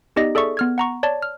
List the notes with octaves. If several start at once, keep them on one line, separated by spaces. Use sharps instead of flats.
B3 D#4 G4 D5 D#5 A#6
G#4 A4 D5 E5 C#6
B3 F6 G#6
F#5 A#5 C#6
C#5 D5 A5
F6